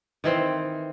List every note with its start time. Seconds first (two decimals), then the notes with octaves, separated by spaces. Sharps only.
0.24 D#3 E3 C4